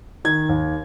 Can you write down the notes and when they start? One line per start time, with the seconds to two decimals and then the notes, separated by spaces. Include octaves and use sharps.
0.25 D#3 G#6
0.49 D#2